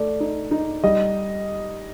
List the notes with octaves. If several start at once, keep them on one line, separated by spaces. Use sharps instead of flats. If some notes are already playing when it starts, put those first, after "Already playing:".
Already playing: A3 D5
D#4
D#4
G3 D#5